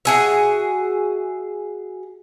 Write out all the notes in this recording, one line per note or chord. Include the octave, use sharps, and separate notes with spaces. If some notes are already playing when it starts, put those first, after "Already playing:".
F#4 G#4 E5